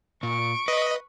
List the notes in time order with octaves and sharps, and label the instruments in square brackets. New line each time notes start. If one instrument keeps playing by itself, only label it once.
[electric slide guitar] A#2 [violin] C#6 D7
[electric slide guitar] B4 [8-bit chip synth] D#5